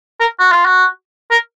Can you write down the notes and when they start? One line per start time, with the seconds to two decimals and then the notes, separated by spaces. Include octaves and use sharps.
0.20 A#4
0.39 F#4
0.52 F4
0.66 F#4
1.31 A#4